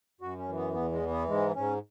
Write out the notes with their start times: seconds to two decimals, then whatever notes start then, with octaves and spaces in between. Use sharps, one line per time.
0.21 F#2 F#4
0.38 C#4
0.48 E3
0.56 B3
0.74 E2 B3
0.92 G#3
1.02 E3
1.11 B3
1.28 G#2 G#3
1.55 G#2 C#4